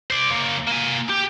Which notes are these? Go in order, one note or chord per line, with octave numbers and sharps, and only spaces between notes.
C5 D5
C#3 A#3
A#3 G#5
G4